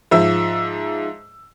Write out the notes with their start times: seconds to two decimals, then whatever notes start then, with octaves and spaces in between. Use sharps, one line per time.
0.11 G#2 F3 E5 E6